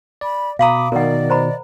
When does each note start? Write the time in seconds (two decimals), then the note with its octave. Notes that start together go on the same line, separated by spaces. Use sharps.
0.21 D5 B5
0.59 B2 F5 A#5 B5 D6 D#6
0.92 B2 D#3 A#4 D5 D#5 F#5
1.30 C5 A#5 B5